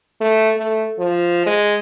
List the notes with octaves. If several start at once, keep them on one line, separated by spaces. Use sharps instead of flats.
A3
A3
F3
G#3